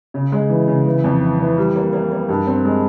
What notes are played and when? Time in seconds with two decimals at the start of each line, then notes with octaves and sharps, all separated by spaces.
0.14 C#3
0.32 G#3
0.49 E3
0.68 C#3
0.86 E3
1.04 F2
1.22 E3
1.39 E3
1.57 G3
1.76 A#3
1.93 A#3
2.12 A#3
2.29 G2
2.47 C4
2.65 G#3